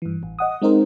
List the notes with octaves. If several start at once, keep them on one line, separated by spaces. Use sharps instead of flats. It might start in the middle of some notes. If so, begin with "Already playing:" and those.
G2 E3
A1
D#5 F#5 D#6
G#3 C4 D#4 A#4 C5